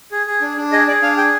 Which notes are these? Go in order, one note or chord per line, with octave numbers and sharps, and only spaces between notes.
G#4
G#4
D4
D4
G#4 D#5
G#4 D5
D4 F5
G#4 G5